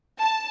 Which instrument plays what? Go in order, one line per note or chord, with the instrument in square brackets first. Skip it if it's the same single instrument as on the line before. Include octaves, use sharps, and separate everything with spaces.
[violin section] A5